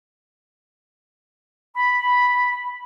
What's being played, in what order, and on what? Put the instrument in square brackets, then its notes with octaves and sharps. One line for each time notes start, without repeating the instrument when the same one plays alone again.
[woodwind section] B5